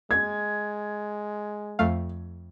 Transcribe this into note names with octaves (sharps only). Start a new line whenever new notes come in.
G#3 G#6
F2 A3 F5